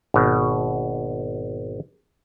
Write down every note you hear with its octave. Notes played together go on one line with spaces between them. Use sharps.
G#1 B2